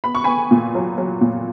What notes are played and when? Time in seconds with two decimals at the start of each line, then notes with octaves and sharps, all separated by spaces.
0.04 B3 B5
0.15 C#6
0.24 B3 G#5 B5
0.51 A#2
0.75 F#3
0.98 F#3
1.21 A#2